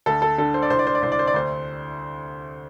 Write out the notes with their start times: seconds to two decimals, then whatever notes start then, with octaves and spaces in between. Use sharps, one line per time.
0.06 D2 A4
0.22 A4
0.38 D3 A4
0.54 C5
0.62 D5
0.70 C2 C5
0.79 D5
0.87 C5
0.95 D5
1.02 C2 C5
1.12 D5
1.19 C5
1.27 D5
1.34 D2 C5